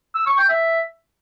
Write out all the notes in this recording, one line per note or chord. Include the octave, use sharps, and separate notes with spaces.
E6
C#6
G5
E5